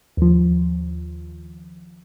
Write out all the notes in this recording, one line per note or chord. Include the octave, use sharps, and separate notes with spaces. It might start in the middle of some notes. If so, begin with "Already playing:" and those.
D#2 F3